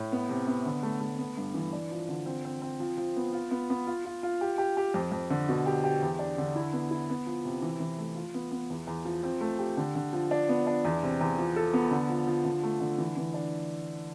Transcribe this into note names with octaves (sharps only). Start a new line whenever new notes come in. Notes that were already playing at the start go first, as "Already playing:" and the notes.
Already playing: A2
B3
C3
B3
D3
A3
A3
B3
G2
E3
D4
F3
D3
C4
C4
C4
F3
F3
B3
F4
B3
B3
F4
F4
F4
G4
G4
G4
F2
F2
D3
B2
G4
G4
E2
D4
D3
E4
B3
E4
B3
F3
C3
E3
E3
A3
F4
B3
B3
E2
E2
F3
C4
A3
G4
D3
D3
F3
D4
B3
D4
E2
C3
E2
F3
A4
B3
D3
F3
F3
D3
A3
D3
E3
E3
D4